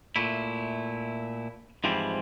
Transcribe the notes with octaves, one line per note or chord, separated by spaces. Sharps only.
A#2 A3 E4
G#2 E3 F3 G3 C4 E4